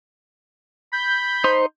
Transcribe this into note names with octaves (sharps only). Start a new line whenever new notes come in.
B5 G6
D#4 C5 C6